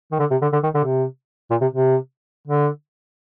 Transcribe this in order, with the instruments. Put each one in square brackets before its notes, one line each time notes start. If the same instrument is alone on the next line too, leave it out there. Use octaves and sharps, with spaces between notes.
[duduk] D#3
D3
C3
D3
D3
D#3
D3
C3
A#2
C3
C3
D3